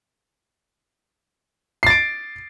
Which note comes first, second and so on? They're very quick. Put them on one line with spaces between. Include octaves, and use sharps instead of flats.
C7 A6 D7